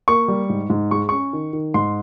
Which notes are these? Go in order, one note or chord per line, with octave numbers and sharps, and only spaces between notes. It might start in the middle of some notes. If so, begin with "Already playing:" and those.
A#3 C#6
G3
G#2
G#2
G#3 C#6
C#4 C#6
D#3
D#3
G#2 C6